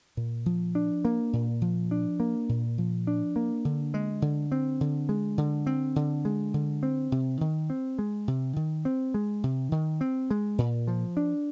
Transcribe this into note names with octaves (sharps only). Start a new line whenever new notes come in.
A#2
F3
D4
A#3
A#2
F3
D4
A#3
A#2
F3
D4
A#3
D3
G#3
D3
C4
D3
G#3
D3
C4
D3
G#3
D3
C4
C3
D#3
C4
G#3
C3
D#3
C4
G#3
C3
D#3
C4
G#3
A#2
F3
D4